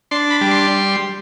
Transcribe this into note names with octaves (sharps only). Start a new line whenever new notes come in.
D4 C6
B5
G3
C6